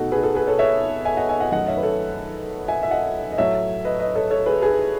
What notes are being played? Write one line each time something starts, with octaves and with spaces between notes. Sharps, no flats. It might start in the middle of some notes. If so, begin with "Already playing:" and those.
Already playing: B2 A3 D#4 F#4 A4
G#4 B4
F#4 A4
G#4 B4
A4 C#5
C#5 E5
E5 G#5
D#5 F#5
E5 G#5
D#5 F#5
F#2 D#3 A3 D#5 F#5
C#5 E5
B4
A4 C#5
E5 G#5
E5
D#5 F#5
D#5
A2 F#3 A3 C#5 E5
B4 D#5
B4 D#5
A4 C#5
A4 C#5
G#4 B4
G#4 B4